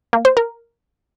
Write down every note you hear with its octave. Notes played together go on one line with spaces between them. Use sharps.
A#3
C5
A#4